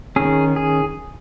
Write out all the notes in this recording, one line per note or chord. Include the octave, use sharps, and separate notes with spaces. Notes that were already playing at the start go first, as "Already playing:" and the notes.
D#3 C#4 G#4
G#4